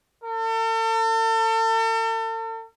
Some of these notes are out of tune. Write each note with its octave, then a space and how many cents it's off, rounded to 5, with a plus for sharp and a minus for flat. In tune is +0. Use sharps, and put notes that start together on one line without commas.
A4 +40